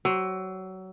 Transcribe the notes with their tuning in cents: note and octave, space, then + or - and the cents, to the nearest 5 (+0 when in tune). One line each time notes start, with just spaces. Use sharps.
F#3 +25 C5 +45